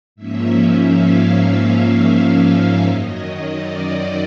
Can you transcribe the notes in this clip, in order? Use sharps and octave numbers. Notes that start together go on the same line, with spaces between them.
G#2 F3 A#3 C#4 E5
F5
E5
F#2 D#3 F#3 D#5
D5